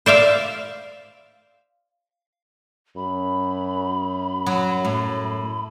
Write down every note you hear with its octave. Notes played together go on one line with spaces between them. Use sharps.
C5 D5 E5 F5
F#2 B5
F#3
A2